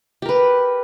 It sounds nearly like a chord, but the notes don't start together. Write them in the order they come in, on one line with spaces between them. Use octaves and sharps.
G4 A#4 B4